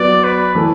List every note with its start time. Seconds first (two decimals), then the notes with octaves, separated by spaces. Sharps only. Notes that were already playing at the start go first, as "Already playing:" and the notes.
Already playing: F#3 B3 D5
0.24 B4
0.55 E3 A3